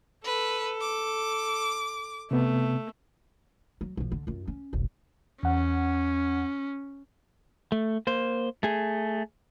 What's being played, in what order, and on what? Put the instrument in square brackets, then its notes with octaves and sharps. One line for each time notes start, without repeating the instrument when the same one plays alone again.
[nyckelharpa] A4 [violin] B4
[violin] D6
[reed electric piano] C3 B3 [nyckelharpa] A3
[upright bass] F#3
B1 F3
D3
F#2 F4
C#4
F1 B1
[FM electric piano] E2 F#5 [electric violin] C#4
[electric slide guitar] A3
A#3 C5
A3 G#4